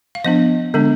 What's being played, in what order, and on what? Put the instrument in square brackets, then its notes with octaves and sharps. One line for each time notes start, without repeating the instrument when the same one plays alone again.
[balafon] F5
F3 B3 D4 D#5
D3 G#3 B3 D4